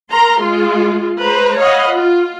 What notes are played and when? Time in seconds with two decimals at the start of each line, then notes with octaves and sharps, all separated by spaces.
0.10 A#4 A#5 C6
0.41 G#3 F4
1.20 G#3 B4 C5 A#5
1.60 C#5 D#5 F5 F#5 B5
1.92 F4